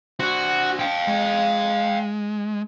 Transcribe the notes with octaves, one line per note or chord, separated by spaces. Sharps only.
D4 F#4 C5
F5 G5
G#3